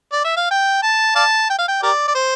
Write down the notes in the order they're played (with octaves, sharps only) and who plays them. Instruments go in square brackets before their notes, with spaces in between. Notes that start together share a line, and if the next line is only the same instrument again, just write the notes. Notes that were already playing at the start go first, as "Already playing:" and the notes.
[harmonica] D5
E5
F5
G5
A5
D5 F5 A5
G5
F5
G5
G4 A#4 D5
D5
C5